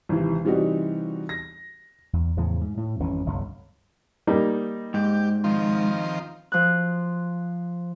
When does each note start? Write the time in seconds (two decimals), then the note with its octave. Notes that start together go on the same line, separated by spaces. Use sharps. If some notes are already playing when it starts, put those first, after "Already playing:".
0.09 G#1 C3 E3
0.44 C3 E3 G3 C4 D#4 F#4
1.29 A#6
2.13 E2
2.37 E2 A2 C#3 F3
2.61 G#2
2.77 A2
3.00 G#1 F2 E3 C#4
3.26 G1 C#2 G2 F#3
4.27 G3 A#3 D#4
4.94 G#2 G4
5.44 D#3 F3 C4
6.52 F3 F#6